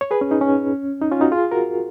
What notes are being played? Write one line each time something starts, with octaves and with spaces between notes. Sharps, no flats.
C#5
G#4 B4
C#4
D#4
C#4
D#4
C#4 F4
D#4 F#4
F4 G#4
F#4 A#4